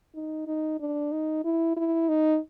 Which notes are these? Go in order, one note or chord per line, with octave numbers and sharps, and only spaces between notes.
D#4
D#4
D4
D#4
E4
E4
D#4